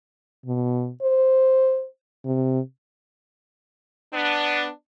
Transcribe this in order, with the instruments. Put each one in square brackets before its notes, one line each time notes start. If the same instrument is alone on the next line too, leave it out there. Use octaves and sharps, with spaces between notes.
[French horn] B2
C5
C3
[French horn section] B3 D4